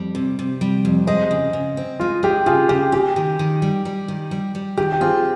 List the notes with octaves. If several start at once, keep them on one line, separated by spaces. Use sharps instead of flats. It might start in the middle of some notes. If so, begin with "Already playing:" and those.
Already playing: F2 G3
C3
C3
G3
F2
G#3 C5 D#5
C#3
C#3
C4
G#3 F4
G#3 G4
C#3 F4 G#4
C#3 G4
A#3 G4
D#3
D#3
G3
G3
D#3
G3
G3
D#3 G4
G4
C4 F4 G#4